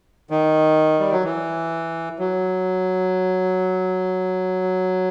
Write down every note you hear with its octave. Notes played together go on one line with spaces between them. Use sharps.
D#3
G3
F#3
E3
F#3